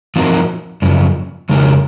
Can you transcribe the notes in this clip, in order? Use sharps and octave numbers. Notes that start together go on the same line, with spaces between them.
F3 C4 D#4 F#4 A#4
F#2 C#3 F3
F2 C#3 G#3 D#4 A#4